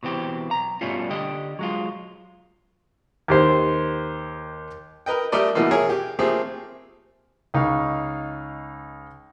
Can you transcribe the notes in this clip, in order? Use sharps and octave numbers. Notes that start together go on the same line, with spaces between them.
B2 E3 C4 G4
B1 A#5
G2 B2 G3 A3 C#4 F4
D3 G4 D#5
F#3 G#3 F4
D#2 G4 C5
A#4 B4 D#5 G5
G3 A3 A#4 D5 D#5
B2 E3 A3 A#3
G#4 A#4 C#5 E5 G#5
G4
F3 A3 A#3 C4 G4 G#4
C#2 D#4 F5 C#6